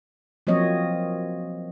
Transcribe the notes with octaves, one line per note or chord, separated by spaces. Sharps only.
F3 F#3 A#3 C4 C#5 D#5